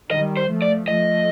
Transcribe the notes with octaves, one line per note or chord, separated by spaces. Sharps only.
D#3 G3 D#5
C5
F3 A3
D5
F3 A3 D#5